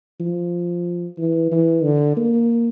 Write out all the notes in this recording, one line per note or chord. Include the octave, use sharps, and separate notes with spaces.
F3
E3
E3
D3
A#3